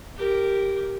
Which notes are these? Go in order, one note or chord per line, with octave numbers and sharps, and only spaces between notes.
G4 A#4